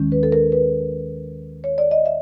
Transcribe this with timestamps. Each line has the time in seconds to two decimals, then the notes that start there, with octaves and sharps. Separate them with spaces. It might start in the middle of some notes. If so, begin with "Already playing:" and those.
Already playing: D#2 D#3 G#3 C#4
0.12 B4
0.23 A4
0.32 A#4
0.52 B4
1.64 C#5
1.78 D5
1.91 D#5
2.06 E5